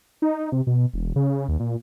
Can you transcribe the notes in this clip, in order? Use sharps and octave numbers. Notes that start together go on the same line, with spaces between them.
D#4
C3
B2
E1
C#3
D#2
A#2